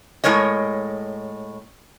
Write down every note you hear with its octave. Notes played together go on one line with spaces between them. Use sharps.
A2 G#3 A#4 C#5 D#5